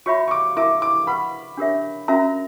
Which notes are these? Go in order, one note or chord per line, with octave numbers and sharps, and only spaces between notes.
F#4 C#5 E5 B5 C#6
C#6
D6
E4 A#4 E5 A#5 D6
D6
B4 F#5 B5 C#6
D4 G4 A#4 C#5 E5
C#4 F#4 A#4 E5 A#5